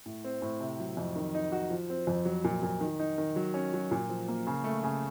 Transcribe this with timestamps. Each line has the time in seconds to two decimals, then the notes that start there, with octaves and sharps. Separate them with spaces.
0.06 A2
0.24 C4
0.42 A2
0.60 C3
0.79 F#3
0.97 F2
1.16 D#3
1.35 D#4
1.52 F#4
1.70 F3
1.90 C4
2.07 F2
2.25 F#3
2.44 A#2
2.63 A#2
2.81 D#3
2.99 D#4
3.18 D#3
3.36 F#3
3.54 C#4
3.73 F#3
3.91 A#2
4.09 F3
4.28 A#3
4.47 C#3
4.64 A3
4.84 C#3